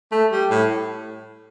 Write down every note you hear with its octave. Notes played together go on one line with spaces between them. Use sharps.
A3
G3
A2